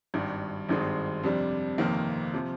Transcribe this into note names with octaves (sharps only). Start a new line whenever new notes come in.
G#1 G2 D#3
G#1 G2 D#3 G#3 C4
F2 C3 G3 D4
G1 F2 C3 D#3 A#3
C3 F3